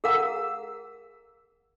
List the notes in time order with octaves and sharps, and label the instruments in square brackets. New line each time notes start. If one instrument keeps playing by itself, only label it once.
[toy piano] G#4 A#4 F5 F#5 A#5 E6